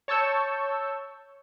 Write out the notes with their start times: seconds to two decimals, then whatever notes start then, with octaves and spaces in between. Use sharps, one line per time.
0.08 C#5 A5 C#6 E6 G6